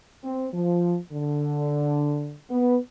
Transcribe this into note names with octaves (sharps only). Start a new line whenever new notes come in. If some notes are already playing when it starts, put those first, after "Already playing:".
C4
F3
D3
B3